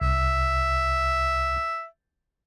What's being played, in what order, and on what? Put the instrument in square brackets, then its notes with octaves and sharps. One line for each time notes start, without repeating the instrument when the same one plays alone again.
[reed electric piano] C2 [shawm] E5